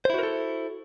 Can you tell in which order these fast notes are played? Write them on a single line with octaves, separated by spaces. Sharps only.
C5 E4 F#4 A#4 A4